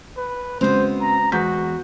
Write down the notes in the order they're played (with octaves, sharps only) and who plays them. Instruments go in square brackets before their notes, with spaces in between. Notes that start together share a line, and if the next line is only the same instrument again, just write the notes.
[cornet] B4
[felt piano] C#3 F#3 G#3 [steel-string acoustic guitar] B3 C4 [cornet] C5
[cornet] A#5
[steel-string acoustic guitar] E2 [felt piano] G#3 G6 B6 [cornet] F#4